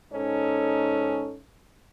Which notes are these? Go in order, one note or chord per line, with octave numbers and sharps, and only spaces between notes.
G#2 C#4 D#4 A4